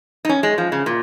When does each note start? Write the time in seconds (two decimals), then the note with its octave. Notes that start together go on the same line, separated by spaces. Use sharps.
0.25 D#4
0.29 C#4
0.43 G#3
0.58 F3
0.72 C#3
0.86 A#2